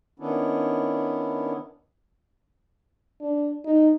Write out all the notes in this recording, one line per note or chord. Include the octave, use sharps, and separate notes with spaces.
D#3 B3 C#4 D4 E4
D4
D#4